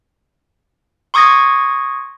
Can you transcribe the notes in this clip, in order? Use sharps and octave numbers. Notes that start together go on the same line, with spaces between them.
C6 C#6 D#6 G#6 A#6